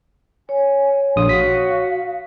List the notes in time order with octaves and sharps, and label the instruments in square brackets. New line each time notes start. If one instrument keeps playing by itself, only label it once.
[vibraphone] C#5 [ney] G#5
[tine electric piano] A#1 D#6 [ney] F5 [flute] C6
[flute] F#4 [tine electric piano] B6